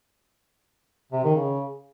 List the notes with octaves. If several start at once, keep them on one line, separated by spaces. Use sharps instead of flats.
C3
D#3
C#3